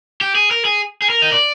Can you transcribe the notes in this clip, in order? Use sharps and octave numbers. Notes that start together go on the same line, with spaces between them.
G4
G#4
A#4
G#4
G#4
A#4
D#5
D5